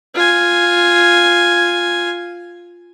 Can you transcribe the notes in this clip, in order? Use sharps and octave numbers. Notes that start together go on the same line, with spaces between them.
F4 G#5